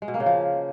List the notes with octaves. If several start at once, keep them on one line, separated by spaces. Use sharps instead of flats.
G#3
B2
A#3
C#3
F3